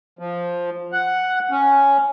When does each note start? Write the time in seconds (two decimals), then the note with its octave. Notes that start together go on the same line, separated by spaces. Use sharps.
0.19 F3
0.93 F#5
1.51 C#4